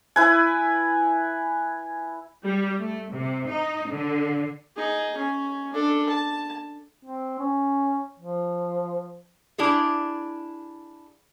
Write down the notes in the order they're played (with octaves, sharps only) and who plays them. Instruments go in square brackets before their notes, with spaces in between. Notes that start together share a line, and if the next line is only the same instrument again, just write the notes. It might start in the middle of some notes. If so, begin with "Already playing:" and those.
[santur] E4 B4 G#5
[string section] G3
A3
C3
D#4
D3
[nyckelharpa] D#4 G#4
C#4
D4 A4
A5
[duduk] C4
C#4
F3
[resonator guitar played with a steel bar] D4 E4 G4 G#4